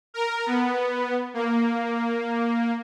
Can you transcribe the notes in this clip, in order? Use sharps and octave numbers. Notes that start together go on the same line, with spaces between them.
A#4
B3
A#3